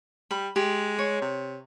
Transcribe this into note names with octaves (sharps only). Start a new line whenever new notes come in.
G3 B5
G#3 G4
C#5
C3